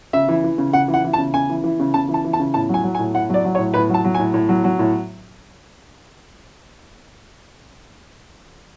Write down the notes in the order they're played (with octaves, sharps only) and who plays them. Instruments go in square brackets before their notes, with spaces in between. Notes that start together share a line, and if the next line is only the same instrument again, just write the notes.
[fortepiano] C#3 E5
E3
E3
C#3
C#3 F#5
E3
F#5
E3
A5
C#3
C#3 G#5
E3
E3
C#3
C#3 A5
E3
A5
E3
A5
C#3
A2 A5
F#3 G#5
F#3
G#5
A2
A2 F#5
F#3 D5
F#3
C#5
A2
A2 B4
F#3 A5
F#3
G#5
A2
A2
F#3
F#3
A2